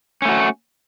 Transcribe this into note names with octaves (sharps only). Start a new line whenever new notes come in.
A3 C#4 F#4